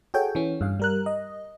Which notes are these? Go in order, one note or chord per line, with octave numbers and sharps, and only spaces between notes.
F#4 G#4 A4 C#5 G5
E3 C#4
G2 F5
G3 A#4 F#6
D#5